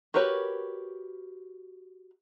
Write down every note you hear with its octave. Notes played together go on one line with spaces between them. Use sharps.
F#4 G4 A#4 B4 C#5